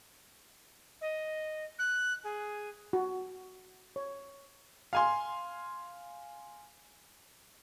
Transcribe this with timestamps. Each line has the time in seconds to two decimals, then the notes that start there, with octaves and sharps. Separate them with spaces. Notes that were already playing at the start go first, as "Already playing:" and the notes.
1.01 D#5
1.78 F#6
2.23 G#4
2.93 F#4
3.96 C#5
4.93 F5 G#5 C6